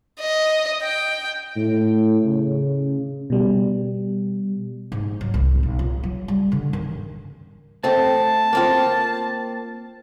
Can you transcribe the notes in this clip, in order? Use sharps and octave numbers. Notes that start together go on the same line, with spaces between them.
D#5
G5
A2
C#3
B2 G3
G#2
F#3
C2
B1
F4
F#3
G3
D3
D#3
A3 C4 A5
A#3 C4 F4